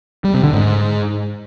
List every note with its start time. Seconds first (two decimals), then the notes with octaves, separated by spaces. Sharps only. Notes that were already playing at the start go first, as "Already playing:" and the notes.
0.24 G3
0.34 C3
0.44 D3
0.53 G#2